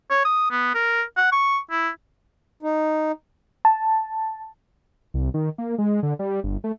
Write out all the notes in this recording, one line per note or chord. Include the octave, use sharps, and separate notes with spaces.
C#5
D#6
B3
A#4
F#5
C#6
E4
D#4
A5
C2
D#3
A#3
G#3
D3
G3
G1
A3